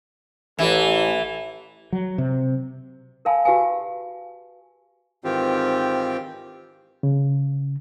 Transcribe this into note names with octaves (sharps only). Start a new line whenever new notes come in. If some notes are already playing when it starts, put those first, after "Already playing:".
A1 E3
F#3
C3
A#4 D5 F5 G#5 A5 B5
F#4 G4 B4 F5 G#5
G#2 D#3 E3 C4 F4 G4
C#3